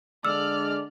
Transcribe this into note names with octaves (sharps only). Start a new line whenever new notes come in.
D3 G#3 D5 E6 F6